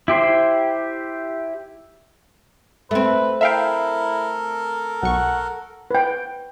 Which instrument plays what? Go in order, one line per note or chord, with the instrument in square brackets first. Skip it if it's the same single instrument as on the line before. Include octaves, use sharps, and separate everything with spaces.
[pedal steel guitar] E4 G4 C5 C6
[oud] A3 C4 [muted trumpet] B4
[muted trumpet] E4 [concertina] A4 A#4 [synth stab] E5 F5 G5
[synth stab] B1 C#6 [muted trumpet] F#5
[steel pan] B4 G5